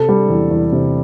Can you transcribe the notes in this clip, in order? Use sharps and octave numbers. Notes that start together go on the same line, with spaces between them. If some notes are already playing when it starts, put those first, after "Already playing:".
Already playing: C3 A4
G3
E2
E2
C3